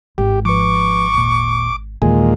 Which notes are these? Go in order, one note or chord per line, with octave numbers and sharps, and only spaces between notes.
G#1 G#2 G4
F3 B4 C#6 D6
D#2 A#2
D#2 A#2 E3 G#3 G#5